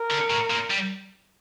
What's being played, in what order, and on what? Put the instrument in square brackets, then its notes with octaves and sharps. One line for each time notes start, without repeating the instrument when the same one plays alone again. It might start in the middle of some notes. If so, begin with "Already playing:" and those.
Already playing: [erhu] A#4
[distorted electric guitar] D3
A2
A#2
G3